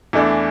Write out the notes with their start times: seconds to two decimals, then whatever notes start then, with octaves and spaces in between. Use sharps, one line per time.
0.13 E2 E3 A3 D4